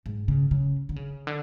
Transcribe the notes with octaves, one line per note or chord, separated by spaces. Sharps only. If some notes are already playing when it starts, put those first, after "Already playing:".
G#2
C#3
C#3
D3
C#3
D3